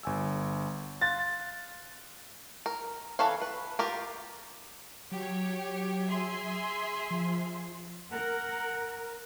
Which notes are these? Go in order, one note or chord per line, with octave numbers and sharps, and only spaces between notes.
G1 G#5 E6
F5 C6 F#6 A6
A#4
E3 A4 B4 C#5 F5
B4
F4 G4 A#4
F#3 G4 C#5
G#4 E5 C6
F3
A#4 F#5